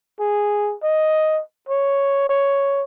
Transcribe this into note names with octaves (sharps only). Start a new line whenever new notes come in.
G#4
D#5
C#5
C#5